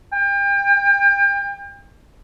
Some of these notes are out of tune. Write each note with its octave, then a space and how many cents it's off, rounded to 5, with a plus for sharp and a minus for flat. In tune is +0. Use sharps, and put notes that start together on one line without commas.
G5 +35